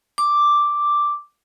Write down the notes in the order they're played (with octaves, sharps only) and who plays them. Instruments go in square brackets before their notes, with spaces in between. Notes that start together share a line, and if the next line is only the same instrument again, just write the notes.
[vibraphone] D6